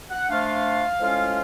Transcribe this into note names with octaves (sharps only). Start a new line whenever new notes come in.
F#5
F3 A3 D4 F4 F5
A2 F3 G#3 C#4 F4